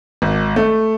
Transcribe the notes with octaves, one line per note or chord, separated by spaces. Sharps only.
G#1
A3